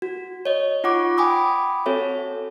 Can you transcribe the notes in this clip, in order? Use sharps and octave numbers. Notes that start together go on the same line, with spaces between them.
F#4
C#5 D#5
D#4 F4 F#5 C#6 D6
G5 G#5 B5 D6 D#6
C4 F#4 A4 C#5 E5